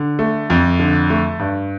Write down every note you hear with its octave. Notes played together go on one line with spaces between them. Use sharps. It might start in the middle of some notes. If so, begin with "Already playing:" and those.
Already playing: D3
A3
F2
D3
A3
G2